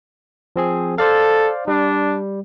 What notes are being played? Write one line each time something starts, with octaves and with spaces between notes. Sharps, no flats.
F3 C4 G#4
A4 C5 D5 F5
G3 D4